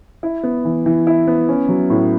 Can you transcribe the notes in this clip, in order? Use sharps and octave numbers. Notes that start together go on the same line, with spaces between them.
E4
B3
E3
E3
E4
B3
C#4
F#3
A2